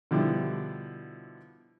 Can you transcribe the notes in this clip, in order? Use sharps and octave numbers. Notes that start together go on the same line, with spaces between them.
B2 D3 F3 G3 E4